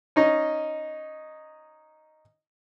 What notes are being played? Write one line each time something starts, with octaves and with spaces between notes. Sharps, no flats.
C#4 D#4 D#5